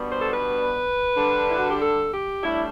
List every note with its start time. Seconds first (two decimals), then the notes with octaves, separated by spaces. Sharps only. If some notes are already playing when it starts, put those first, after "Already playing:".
Already playing: B2 G3 B3 D4
0.10 C5
0.21 A4
0.31 B4
1.16 D3 G3 D4
1.47 E4
1.58 F#4
1.69 G4
1.80 A4
2.11 G4
2.43 A2 G3 D4 E4